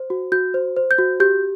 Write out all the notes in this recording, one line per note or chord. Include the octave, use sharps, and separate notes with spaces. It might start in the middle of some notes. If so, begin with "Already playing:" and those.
Already playing: C5
F#4
F#4 G6
C5
C5
G6
F#4
G4 G6